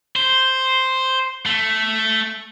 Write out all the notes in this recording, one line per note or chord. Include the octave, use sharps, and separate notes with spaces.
C5
A3